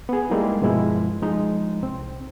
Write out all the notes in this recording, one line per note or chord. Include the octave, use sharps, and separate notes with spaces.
B3 G#4
G3 G#3 A#3 C4 D#4 E4
G2 B2 F3 G#3 E4
F3 G#3 D#4
C2 C4